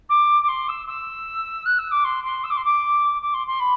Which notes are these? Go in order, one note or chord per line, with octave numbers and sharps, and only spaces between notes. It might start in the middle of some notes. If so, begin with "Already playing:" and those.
D6
D6
C6
E6
E6
F#6
E6
D6
C6
C6
E6
D6
C6
D6
D6
C6
C6
B5